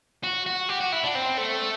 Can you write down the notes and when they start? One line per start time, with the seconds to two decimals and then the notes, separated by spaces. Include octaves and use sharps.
0.24 F#4
0.46 F#4
0.69 G4
0.80 F#4
0.92 E4
1.04 D4
1.15 C4
1.37 A3